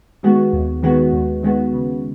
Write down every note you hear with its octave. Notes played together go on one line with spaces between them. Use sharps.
D#3 G#3 B3 F#4
D#2
D#3 G#3 B3 F#4
D#2
D#3 G#3 B3 F#4
C#3